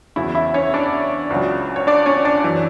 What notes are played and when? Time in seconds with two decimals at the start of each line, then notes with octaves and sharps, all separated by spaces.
0.16 E2 C#3 F#3 E4 E5
0.35 E4 E5
0.54 C#4 C#5
0.74 D4 D5
1.30 C#2 C#3 F#3
1.76 C#5
1.87 D4 D5
2.06 C#4 C#5
2.25 D4 D5
2.44 F#2 E3